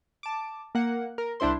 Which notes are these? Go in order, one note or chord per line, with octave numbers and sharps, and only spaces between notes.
A5 D6
A#3 F#5
A#4
C2 D4 E4 C5 C6